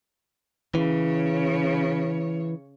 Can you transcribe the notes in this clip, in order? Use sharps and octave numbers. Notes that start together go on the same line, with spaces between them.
C#3 E3 C#5